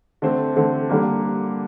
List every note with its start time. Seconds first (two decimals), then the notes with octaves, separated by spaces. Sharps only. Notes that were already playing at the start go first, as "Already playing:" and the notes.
0.22 D3 A3 C4
0.56 D3 A3 C4
0.89 D3 G3 A#3